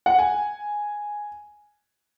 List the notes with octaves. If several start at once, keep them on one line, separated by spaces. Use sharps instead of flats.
F#5
G#5